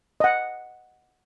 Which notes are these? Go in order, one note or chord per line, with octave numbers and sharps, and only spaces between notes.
D#5 F#5